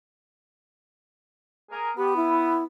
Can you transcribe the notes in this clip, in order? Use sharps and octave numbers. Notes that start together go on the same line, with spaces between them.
G#4 A#4
B3 G4
E4